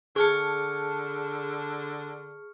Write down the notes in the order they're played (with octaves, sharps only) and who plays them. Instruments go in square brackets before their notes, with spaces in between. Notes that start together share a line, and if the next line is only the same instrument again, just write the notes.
[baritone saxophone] D3 [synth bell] G#4 A5 [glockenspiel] C#6 F6 C#7